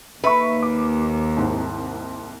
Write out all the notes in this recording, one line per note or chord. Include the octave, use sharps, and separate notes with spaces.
D#2 B4 E5 C#6
D6
C2 G#2